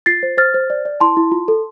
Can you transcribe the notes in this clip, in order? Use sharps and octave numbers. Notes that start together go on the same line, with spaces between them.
F4 A6 C7
C5
C5 F6 A6
C5
D5
D5
E4 A5 C6
E4
F4
A4